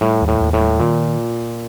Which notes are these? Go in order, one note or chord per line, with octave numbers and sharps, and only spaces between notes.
A2 G3
D#2
A2
D#2
A2
G3
A#2 D#3